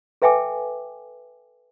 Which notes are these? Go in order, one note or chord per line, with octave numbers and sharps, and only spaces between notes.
A4 B4 E5 G5 G#5 D6